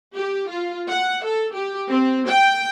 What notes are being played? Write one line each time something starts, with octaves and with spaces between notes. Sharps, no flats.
G4
F4
F#5
A4
G4
C4
G5